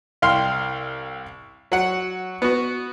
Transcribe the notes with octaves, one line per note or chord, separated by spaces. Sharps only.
C2 F5 G5 C6 F6
F#3 F#5
B3 F#4